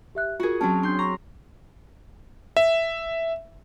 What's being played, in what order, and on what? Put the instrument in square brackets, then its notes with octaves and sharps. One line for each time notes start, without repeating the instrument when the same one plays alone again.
[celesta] G4 E5 F#6
[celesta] F4 A#4 [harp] F#4 G#4
[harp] F#3 C4 C#4 [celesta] A5
[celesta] D4 G6 [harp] C6
[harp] A#5 [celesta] C#6
[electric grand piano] E5